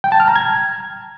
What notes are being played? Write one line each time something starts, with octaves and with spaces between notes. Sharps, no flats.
G5
A5
F6
A#5
G#6